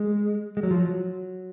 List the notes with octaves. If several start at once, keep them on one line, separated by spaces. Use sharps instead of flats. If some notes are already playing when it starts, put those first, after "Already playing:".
Already playing: G#3
G#3
F#3
F3
F#3